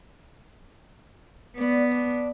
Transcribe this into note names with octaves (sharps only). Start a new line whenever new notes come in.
B3 D5 F#5
D4